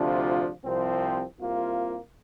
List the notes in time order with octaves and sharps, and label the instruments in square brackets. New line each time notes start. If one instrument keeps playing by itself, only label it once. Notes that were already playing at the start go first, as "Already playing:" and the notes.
Already playing: [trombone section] D2 C3 F3 D4 F4
C2 C3 F3 C4
C2 C3 A#3 F4